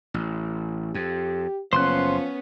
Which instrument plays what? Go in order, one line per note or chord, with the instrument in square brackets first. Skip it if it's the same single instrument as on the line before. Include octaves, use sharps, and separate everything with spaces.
[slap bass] A1
[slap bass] F2 [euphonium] G4
[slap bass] F#1 [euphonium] F3 [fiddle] B3 C#4 [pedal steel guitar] C5 C6 F#6